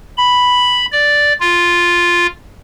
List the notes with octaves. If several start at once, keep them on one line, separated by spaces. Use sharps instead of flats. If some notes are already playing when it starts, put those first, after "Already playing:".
B5
D5
F4